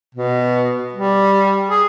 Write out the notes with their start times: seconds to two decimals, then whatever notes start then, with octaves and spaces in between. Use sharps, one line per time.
0.15 B2
0.93 G3
1.70 G#4